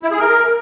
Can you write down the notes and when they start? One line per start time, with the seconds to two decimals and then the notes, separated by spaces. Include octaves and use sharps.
0.03 E4
0.11 G#4
0.19 A#4